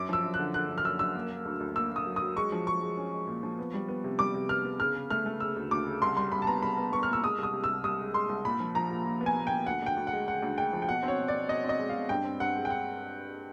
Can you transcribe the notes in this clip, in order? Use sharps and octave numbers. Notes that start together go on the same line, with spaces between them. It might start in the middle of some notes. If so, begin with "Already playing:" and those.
Already playing: F#2 D6
F3 E6
F#2
F#6
D3
D3 F#6
F#2
F6
F#2 E6
F#2 E6
A#3
A#3
D2
D2
A#3 E6
A#3 D#6
F#3
D#6
F#3
G#3 C#6
F3
G#3 C#6
G#3
C#4
G#3
A#2
F3
B3
G3
B3
C3
G3 D6
C3
B3 F6
B3
C#3 F6
C#3
A3 F6
A3
C#3 E6
D2
D2 D6
C#3
C2 C6
G3 C6
C2 B5
A5
B3 A#5
C2 B5
B3
B3 C#6
F6
A#2
E6
G#3 D#6
C2
D#6
C3
E6
C2
C2 D#6
G#3
G#3 C6
C2
A#2 B5
F3
F3 A#5
A#2
A#2
B3
G#5
A#2
A#2 G5
D2 F#5
D2 G5
D2
F#5
G#3
C#3 F#5
D2
G#3 G5
F3
G5
B2 F#5
C4
C#5
B2
D5
B2
B2 D#5
C4
D#5
G#3
F5
B2
G2 G5
C4
G2 F#5
G#3
G5
F#5